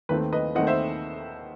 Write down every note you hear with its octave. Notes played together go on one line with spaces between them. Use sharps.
D#2 D#3 A3 C4 B4
B4 D#5
D#2 D#3 A3 C4 D#5 F#5
C5 E5